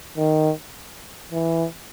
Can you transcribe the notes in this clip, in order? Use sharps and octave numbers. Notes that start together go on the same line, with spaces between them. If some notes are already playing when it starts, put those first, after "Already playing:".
D#3
E3